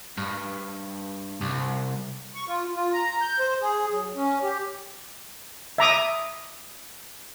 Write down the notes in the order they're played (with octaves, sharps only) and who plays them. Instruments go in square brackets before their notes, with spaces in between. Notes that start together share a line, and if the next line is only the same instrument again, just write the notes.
[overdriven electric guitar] G2
C2
[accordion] C#6
F4
F4
A#5
G6
C5
G#4
F#3
C#4
G4
[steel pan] E5 A#5 D6 D#6